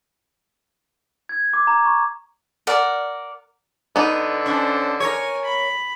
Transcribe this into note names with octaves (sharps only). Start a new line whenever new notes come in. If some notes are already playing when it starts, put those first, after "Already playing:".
G#6
D6
A#5
C#6
A#4 D5 F#5
D3 B3 D#4
C#4 D4 C5
A#4 C#5 G#5
B5